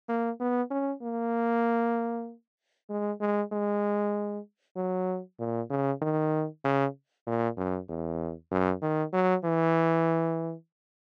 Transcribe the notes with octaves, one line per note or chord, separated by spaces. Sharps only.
A#3
B3
C#4
A#3
G#3
G#3
G#3
F#3
A#2
C#3
D#3
C#3
A#2
F#2
E2
F#2
D#3
F#3
E3